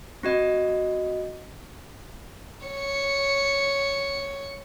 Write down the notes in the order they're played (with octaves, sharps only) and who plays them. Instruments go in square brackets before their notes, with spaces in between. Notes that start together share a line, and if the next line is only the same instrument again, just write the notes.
[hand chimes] C4 F#4 D#5
[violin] C#5 C#7